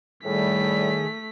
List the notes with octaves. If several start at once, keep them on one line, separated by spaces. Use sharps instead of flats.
A2 D#3 G3 A3 G#4 B6